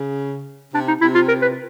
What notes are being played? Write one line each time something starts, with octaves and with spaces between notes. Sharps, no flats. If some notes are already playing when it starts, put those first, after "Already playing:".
Already playing: C#3
C3 D4
D#4
C3 E4
F4
A#4
B4